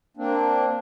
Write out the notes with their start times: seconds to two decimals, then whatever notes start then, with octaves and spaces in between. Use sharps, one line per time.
0.17 A#3 C4 D4